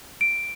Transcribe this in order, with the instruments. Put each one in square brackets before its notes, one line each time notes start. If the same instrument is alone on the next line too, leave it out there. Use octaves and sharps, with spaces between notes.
[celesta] D7